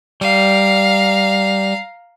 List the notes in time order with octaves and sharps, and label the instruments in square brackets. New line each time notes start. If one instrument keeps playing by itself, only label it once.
[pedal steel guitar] G3 [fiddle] F5 A#5